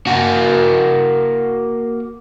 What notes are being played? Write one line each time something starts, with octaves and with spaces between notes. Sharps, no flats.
A#3 F#4